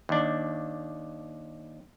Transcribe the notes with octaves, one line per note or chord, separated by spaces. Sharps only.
D#2 D4